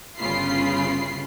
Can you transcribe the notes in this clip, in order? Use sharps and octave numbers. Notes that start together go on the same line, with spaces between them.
G1 C#3 F4 B5 C7